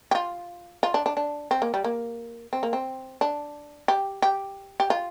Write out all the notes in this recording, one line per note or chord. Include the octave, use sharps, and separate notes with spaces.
G4
F4
F4
D4
D4
D4
C4
A#3
G3
A#3
C4
A#3
C4
D4
G4
G4
G4
F4